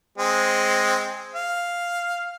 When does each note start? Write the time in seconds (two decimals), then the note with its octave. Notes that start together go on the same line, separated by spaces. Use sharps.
0.18 G#3 C4
1.35 F5